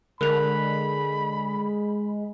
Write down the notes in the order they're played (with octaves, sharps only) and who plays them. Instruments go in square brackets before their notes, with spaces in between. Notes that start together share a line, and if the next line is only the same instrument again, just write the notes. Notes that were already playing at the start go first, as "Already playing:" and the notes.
[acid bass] D3 [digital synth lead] G#3 [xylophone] A#4 F#6 F7 [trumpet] B5